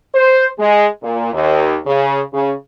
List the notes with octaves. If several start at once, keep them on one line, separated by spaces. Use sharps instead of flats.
C5
G#3
A#2
D#2
C#3
C#3